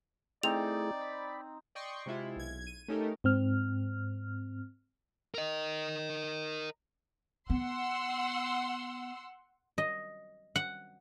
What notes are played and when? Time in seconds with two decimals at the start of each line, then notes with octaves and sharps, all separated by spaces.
0.43 A3 C4 D#4 E4 G#4 D5 F7
1.01 B5
1.75 D5 D#5 G5 C6 C#6
2.06 C3 G#3 E4 F4
2.36 B1 G#6
2.67 D#7
2.88 A3 C#4 D#4 G4 A4 A#4
3.24 G#2 C4 F6
5.35 A#4 D#5
7.50 B3 F#5 C6 E6
9.78 D#5
10.56 F#5